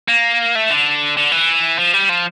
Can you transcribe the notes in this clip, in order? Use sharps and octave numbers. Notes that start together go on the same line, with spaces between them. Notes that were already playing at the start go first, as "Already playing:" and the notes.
A#3
A3
D3
D3
E3
F3
G3
F3